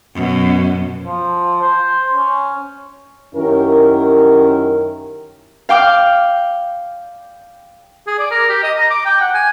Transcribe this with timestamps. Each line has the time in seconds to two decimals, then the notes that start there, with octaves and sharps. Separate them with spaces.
0.14 F#2 B2
1.01 F3
1.62 C5
2.14 C#4
3.35 F#2 D#3 C#4 E4 G4 A#4
5.69 F5 G5 D6 F6
8.07 G#4
8.19 D5
8.31 A#4
8.49 G4
8.63 D#5
8.78 A#5
8.90 D6
9.06 G5
9.21 F#5
9.34 G#5